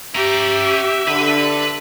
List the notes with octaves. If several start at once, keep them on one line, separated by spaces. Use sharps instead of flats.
C#4 G4 E5 A#5
D3 B4